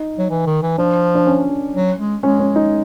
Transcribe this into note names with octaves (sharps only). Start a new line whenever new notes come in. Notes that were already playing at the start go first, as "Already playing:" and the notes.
Already playing: D#4
F#3
E3
D#3
E3
F3 D4
D4
C#4
F#3
G#3
G#3 C#4
C#4
D#4